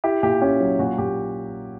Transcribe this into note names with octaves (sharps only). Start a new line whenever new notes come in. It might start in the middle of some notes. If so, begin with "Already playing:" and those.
E4 G4
A#2 G4
C#4 G4
F#3
A#2 F#4
A#2 G4